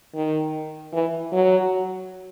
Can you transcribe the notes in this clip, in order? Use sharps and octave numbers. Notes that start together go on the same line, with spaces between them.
D#3
E3
F#3